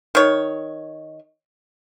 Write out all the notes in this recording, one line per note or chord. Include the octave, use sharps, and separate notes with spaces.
D#3 C#5